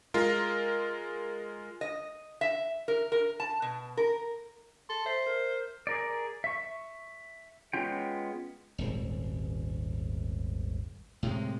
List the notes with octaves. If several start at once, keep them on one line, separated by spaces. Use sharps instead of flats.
G#3 F4 A#4
D#5
E5
A#4
A#4
A5
B2
A#4
A4 C6
C5 E5
A#4
G#4 A#4 D5
E5 C#6
G#3 B3 C#4 F4 G5
D#1 G#1
A2 C3 G#3